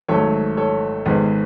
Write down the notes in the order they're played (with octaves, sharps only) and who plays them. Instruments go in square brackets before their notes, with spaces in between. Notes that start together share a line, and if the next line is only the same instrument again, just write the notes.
[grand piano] G#1 G#2 F#3 A3 A4 C#5
A4 C#5
G#1 G#2 G#3 B3